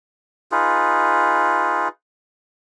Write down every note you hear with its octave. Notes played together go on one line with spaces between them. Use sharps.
D#4 F4 G#4 B4